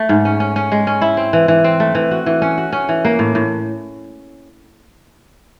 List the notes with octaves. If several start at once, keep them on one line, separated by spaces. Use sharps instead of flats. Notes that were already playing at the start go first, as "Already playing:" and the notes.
Already playing: A3
G#2
C#4
C#4
C#4
G#3
C#4
E4
C4
E3
E3
C4
A3
E3
F#4
E3
C#4
F#4
C#4
E3
A#3
A2
A2